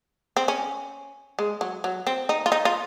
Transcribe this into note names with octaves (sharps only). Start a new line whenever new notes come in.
C4
C#4
G#3
F#3
F#3
C4
D#4
F4
D#4
F4